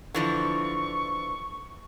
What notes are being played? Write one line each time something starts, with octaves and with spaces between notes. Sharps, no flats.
D3 E3 F3 C#6